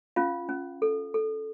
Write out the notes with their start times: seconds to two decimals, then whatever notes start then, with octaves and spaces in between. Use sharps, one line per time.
0.16 C#4 F4 F5
0.49 C#4
0.82 A4
1.14 A4